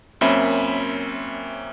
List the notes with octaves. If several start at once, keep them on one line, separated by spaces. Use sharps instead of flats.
F#2 A#3 C4 C#4 E5 B5